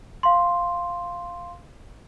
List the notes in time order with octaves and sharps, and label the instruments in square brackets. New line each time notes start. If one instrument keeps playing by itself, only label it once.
[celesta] F5 C6